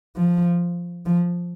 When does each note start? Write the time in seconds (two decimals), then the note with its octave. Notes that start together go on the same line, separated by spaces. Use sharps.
0.16 F3
1.06 F3